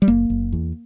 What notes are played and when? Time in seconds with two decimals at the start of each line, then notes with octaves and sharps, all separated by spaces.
0.02 G3
0.08 F#1 A#3
0.30 F#1
0.52 E2